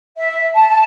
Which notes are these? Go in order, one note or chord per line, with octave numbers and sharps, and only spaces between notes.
E5
A5
A5